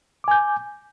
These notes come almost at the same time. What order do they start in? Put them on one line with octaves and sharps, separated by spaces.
D6 G#5 G6